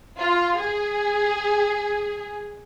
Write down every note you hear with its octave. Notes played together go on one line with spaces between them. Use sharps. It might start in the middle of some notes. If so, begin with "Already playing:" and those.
F4
G#4